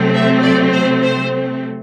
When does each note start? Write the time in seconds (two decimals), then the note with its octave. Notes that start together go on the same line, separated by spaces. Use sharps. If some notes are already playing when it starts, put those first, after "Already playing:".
Already playing: C3 F#3 A3 C4
0.14 E5
0.43 D5
0.73 C5
1.03 C5